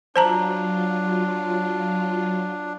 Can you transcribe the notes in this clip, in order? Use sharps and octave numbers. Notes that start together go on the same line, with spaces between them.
F#3 D4 F4 C5 A5 A#5